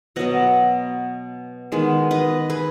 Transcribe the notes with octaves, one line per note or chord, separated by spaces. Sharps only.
B2 F#3 B3 D#5 F#5
D#3 G#3 B3
B4 D#5
G#4 B4